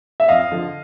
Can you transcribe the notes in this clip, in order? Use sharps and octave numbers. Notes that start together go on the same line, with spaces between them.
E5
F2 D#5 F5
D3 F3